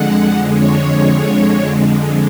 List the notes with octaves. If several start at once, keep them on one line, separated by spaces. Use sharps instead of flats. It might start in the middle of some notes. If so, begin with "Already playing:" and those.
Already playing: F2 D3 G#3 F#5
C#5